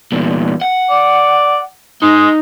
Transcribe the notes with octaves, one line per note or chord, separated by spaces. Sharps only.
E2 A#2
F#5
D5
G#3 D#4